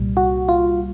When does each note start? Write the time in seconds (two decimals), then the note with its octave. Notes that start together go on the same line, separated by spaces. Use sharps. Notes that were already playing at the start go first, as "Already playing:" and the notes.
Already playing: C2 A#2 G3
0.17 F#4
0.49 F4